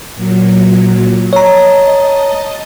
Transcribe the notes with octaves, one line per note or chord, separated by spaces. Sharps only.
A#2 F#3
C#5 D#5 A5 A#5